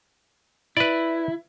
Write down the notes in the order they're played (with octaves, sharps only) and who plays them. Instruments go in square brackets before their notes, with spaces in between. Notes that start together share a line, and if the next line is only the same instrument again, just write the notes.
[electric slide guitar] E4 [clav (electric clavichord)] B4 D5